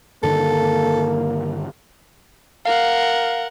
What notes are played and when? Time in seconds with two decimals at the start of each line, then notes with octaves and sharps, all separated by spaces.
0.23 G2 D3 D#3 A#3 A4
2.66 A#4 F5 F#5